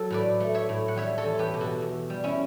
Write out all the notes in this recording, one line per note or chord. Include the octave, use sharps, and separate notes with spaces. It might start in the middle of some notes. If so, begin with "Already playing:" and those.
Already playing: F#3 A4
A2 B4 D5
A3
C#5 E5
A2
F#5
G3 C#5 E5
A4 C#5
E2
G4 B4
B2
F#4 A4
E2
G3
C#4 E4